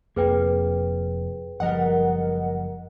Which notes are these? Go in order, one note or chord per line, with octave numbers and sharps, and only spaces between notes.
F1 F2 A#3 G#4 B4 G5
F#1 F3 G3 A#4 D#5 F#5